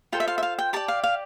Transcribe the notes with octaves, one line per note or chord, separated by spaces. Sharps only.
F4 A4 C5 G5
E5
F5
E5
F5
G5
G4 D5 A5
F5
F5